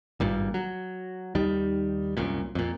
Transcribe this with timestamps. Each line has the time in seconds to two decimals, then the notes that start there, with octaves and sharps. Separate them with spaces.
0.20 G#1 G2 A#2
0.54 F#3
1.35 D#2 D#3 G3
2.17 C2 F#2 A#2
2.55 F2 A#2